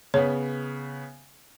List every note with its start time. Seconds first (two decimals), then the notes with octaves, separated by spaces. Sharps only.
0.14 C#3 B3 C#5